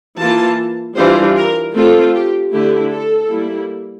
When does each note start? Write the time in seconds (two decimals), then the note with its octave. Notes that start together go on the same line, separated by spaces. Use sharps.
0.19 E3 A#3 F4 A5
0.97 E3 G3 D4 F4 C5
1.37 A#4
1.74 A3 C4 F4 A4
2.14 G4
2.53 D3 A3 E4 G4
2.91 A4
3.30 G3 A#3 E4